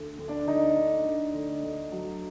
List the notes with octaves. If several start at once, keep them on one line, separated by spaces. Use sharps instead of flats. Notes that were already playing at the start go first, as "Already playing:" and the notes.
Already playing: D2
D2
D4 D5
D3 D#4 D#5
D3
D2
D2
D2
F#3